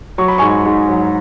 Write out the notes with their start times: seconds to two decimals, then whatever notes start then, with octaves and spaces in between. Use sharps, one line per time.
0.18 F#3 C#6
0.28 B5
0.38 G#2 G#5 C#6
0.65 G#2
0.89 F#3